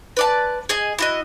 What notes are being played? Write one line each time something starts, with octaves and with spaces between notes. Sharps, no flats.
B4 D5 A5
G#4 D#5 G#5
E4 F#4 D#5